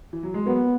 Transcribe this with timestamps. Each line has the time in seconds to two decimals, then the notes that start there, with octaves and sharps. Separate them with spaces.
0.13 E3
0.23 F#3
0.34 G#3
0.46 F#3 A#3 B3